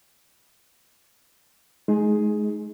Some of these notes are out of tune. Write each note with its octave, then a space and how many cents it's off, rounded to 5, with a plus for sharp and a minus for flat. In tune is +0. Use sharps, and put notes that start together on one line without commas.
G#3 +35 D#4 +0 G#4 +5